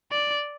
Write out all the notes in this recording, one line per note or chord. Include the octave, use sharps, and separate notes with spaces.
D5